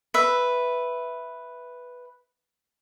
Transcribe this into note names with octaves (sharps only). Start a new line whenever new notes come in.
B4 E5